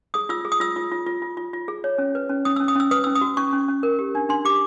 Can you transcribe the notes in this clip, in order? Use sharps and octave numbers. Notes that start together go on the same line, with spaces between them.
G#4 D#6
F4 E6
G#4
D#6
F4 E6
F4
F4
F4
F4
F4
F4
G#4
C#5
C#4
B4
C#4
C#4 D#6
C#4 E6
D#6
C#4 E6
B4 D#6
C#4 E6
D#6
F#4
C#4 C#6
C#4
C#4
A#4
G4
D4
D4 C6
G4 D6